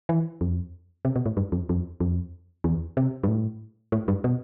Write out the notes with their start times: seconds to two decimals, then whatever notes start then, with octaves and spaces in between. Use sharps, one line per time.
0.09 E3
0.41 F2
1.05 C3
1.16 B2
1.26 A2
1.37 G2
1.52 F2
1.69 F2
2.00 F2
2.64 E2
2.97 C3
3.24 G2
3.28 A2
3.92 A2
4.08 G2
4.24 B2